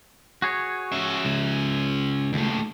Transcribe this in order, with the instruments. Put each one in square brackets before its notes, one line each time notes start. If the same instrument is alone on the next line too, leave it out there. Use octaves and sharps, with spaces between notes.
[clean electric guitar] F#4 G#4 C#5
[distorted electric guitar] C#4 E5
[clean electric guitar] C#2
[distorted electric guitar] D#2 A3